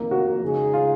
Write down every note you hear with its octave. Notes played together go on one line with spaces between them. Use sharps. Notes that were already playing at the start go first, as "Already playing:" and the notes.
Already playing: F2 C3 D#3 A#3
F#4
C#3 G#3 D#4 G#4
F4